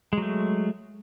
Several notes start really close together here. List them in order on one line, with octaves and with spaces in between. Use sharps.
G#3 F#3 A3